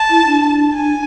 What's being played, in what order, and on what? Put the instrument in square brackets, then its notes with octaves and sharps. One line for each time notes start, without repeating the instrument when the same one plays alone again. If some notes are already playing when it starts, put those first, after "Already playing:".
Already playing: [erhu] A5
[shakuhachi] E4
D4
[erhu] G#5